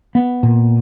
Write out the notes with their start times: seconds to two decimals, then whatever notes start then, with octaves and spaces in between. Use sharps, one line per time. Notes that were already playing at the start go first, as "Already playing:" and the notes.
0.15 B3
0.43 A#2